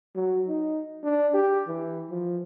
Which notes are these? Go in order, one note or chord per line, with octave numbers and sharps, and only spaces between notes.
F#3
D#4
D4
G4
E3
F3